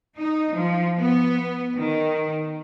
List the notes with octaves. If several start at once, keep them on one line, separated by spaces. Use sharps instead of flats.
D#4
F3
B3
D#3